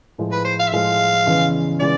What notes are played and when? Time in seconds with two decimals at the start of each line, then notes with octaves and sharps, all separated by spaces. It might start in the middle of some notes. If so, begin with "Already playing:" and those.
0.18 A2 F3 G#3
0.32 B4
0.45 C5
0.59 F5
0.67 E5
0.72 A2 F3 G#3 F5
1.26 E2 C#3 E3 G#3
1.80 C#3 E3 G#3 D5